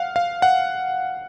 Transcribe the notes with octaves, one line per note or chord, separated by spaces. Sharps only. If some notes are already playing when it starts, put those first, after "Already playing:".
Already playing: F5 F#5
F5
F#5